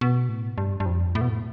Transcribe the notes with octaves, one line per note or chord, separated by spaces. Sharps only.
B2
A2
G2
G2
F2
A2
B2
A2